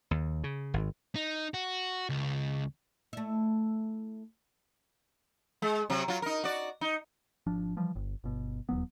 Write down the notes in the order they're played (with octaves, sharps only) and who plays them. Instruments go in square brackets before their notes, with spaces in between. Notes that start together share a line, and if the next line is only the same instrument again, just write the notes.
[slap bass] D#2
C#3
G#1
[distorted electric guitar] D#4
F#4
C#2
[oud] A3 E4
[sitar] G#3
C3 F#3
F#3 F4
D#4 A#4
F#4 D5
D#4
[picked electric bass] G#1 F3 D4
E3 F3 G3
G1
G1 B2
D#1 E2 F#3 B3